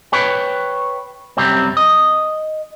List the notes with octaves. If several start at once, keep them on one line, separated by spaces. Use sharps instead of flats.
B4 C#5 G5
F#2 A2 C3 G3 C4
D#5